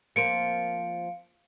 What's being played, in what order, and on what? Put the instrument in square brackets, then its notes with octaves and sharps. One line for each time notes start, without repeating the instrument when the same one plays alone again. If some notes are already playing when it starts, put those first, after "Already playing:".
[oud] F3 A#3 C4 [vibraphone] F5 [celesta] C#7 D7